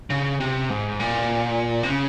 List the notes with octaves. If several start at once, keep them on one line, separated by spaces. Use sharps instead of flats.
C#3
C3
G#2
A#2
C3
C#3